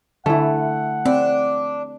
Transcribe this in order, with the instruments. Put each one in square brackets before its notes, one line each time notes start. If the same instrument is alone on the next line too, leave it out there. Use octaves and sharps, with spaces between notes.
[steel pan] D3 E4 [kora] A3 [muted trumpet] F#5
[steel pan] C4 [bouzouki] D4